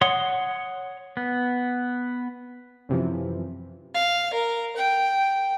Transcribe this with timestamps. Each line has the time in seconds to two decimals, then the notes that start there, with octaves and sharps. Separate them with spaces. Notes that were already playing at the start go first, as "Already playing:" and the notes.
0.01 C#5 F#5 C6 D#6
1.17 B3
2.89 F#2 C3 E3 F3
3.94 F5
4.33 A#4
4.77 G5